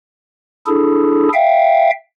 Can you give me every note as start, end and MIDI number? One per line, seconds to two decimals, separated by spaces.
0.67 1.28 62
0.67 1.28 64
0.67 1.28 68
0.67 1.28 69
1.34 1.90 76
1.34 1.90 77
1.34 1.90 79